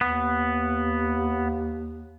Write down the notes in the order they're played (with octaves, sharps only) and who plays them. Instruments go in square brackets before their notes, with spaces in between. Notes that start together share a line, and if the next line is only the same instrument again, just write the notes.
[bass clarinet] D#2 [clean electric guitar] B3